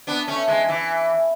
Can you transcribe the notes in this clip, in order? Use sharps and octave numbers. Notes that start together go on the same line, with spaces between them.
B3 D4
A3 C#4
E3 G#3
E3